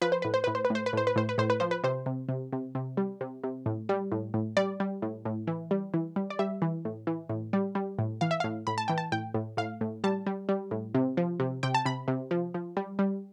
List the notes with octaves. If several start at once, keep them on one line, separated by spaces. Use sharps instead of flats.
F3 B4
C5
A2 B4
C5
A2 B4
C5
B4
A2 C5
B4
A2 C5
B4
A2 C5
B4
A2 C5
B4
F3 C5
B4
C3 C5
C3
C3
C3
C3
G3
C3
C3
A2
G3
A2
A2
G3 D5
G3
A2
A2
E3
G3
E3
G3
D5
G3 E5
E3
A2
E3
A2
G3
G3
A2
E3 F5
E5
F5
A2
A2 B5
A5
E3 G5
A5
A2 G5
A2
A2 F5
A2
G3 A5
G3
G3
A2
C3
F3
C3
C3 G5
A5
C3 B5
C3
F3
F3
G3
G3